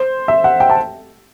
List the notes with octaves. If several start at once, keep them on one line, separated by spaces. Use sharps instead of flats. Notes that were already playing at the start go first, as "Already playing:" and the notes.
Already playing: C5
E5
F#5
G5
A5